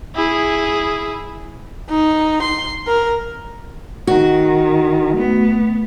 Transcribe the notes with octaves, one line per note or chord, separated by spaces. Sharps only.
E4 G#4
D#4
C6
A#4
D#3 F#4
A3 B3